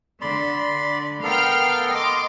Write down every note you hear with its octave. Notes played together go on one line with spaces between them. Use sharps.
D3 D5 B5 C6
B3 A4 A#4 F5 G5 F6
D#5 C6 D6